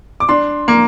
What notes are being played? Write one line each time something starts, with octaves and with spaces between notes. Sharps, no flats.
D6
D4 C6
A#3